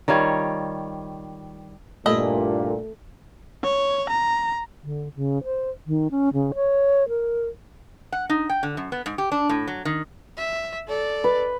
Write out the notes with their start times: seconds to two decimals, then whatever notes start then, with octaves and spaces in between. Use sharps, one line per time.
0.08 D#3 G3 F4 C#5
2.06 G2 A#2 A3 E4 D#5 E5
3.64 C#5
4.10 A#5
4.83 D3
5.16 C#3
5.44 C5
5.87 D#3
6.11 C#4
6.33 C#3
6.55 C#5
7.09 A#4
8.12 F#5
8.30 D#4
8.50 G5
8.63 D3
8.77 F#2
8.92 B3
9.06 G#2
9.18 G4
9.32 D4
9.49 A2
9.67 F#3
9.85 D#3
10.37 E5
10.88 A4 D5
11.24 B4